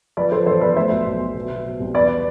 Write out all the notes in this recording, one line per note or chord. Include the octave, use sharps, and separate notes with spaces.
F3 B4 D5
F3 A4 C5
E1 A4 C5
E1 B4 D5
A2 C5 E5
B1
B1
B1
B2
B2
B2
C2
E2 B4 D5